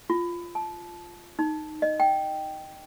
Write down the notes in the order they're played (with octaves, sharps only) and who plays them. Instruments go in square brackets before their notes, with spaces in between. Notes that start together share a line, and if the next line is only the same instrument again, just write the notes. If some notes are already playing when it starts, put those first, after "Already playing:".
[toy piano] F4
A5
D#4
D#5
G5